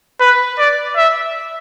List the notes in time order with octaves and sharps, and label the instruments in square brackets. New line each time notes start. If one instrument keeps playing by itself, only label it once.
[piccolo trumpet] B4
D5
E5